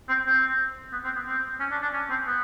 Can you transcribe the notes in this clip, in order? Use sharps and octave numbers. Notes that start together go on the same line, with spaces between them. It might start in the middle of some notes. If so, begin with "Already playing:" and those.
C4
C4
B3
C4
B3
C4
C#4
D4
D4
C#4
C4
B3